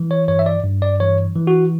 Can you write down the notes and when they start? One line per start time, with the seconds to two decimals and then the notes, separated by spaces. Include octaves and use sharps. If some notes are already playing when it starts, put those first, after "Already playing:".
Already playing: E3
0.11 C#5
0.28 G2 C#5
0.39 E5
0.46 D5
0.64 G2
0.82 D5
1.00 E3 C#5
1.35 E3
1.47 F#4